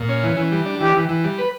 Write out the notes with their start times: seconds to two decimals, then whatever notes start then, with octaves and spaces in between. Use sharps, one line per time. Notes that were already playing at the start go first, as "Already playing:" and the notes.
Already playing: A#2
0.09 C#4
0.23 E3
0.37 E3
0.52 G3
0.66 D4
0.80 E3 G4
0.95 E3
1.09 E3
1.24 G3
1.38 B4